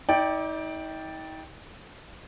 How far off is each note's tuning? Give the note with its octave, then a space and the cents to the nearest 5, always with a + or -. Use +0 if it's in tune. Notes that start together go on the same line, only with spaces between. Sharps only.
D#4 +40 D5 -5 G5 +0